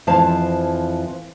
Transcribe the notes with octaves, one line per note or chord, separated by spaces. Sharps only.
F2 E3 F3 F5 A5